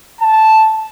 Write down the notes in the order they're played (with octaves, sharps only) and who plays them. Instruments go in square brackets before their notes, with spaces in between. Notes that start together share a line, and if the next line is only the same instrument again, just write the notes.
[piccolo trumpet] A5